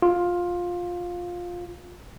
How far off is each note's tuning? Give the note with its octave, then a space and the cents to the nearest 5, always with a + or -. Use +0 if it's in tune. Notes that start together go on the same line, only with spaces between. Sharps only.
F4 +15